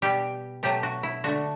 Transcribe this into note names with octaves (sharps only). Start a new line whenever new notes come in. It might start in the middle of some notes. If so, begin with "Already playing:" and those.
B2 G3 G4
B2 F#3 A3 G4
F#4
E4
D3 A3 F#4